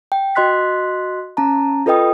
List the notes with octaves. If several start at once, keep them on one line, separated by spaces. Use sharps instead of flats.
G5
F#4 D#5 C6 F#6 B6
C#4 A5 A#5
F4 A4 B4 D#5 G5 D#6